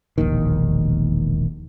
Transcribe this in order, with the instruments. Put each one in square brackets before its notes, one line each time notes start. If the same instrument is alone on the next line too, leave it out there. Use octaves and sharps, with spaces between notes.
[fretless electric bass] E1 A#1 D#2 D#3